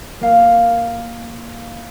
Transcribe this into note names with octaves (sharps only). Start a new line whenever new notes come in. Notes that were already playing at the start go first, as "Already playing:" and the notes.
A#3 F5